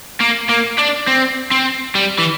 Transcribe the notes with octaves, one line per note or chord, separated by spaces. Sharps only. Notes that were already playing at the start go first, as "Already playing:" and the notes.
A#3
A#3
D4
C4
C4
G3
E3